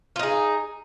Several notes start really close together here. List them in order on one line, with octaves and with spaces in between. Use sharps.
F4 D#4 G#4